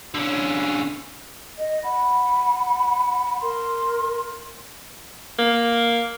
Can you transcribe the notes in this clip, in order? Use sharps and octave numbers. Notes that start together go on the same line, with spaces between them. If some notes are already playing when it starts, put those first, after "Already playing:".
D3 C#4
D#5
F#5 B5
A#4 C6
A#3